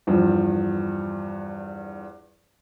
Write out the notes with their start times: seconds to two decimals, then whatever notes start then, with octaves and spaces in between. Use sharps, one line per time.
0.07 E2 G2 F3